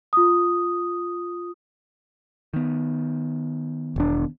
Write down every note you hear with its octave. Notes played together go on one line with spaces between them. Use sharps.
F4 D#6
D#3 B3
E1 D4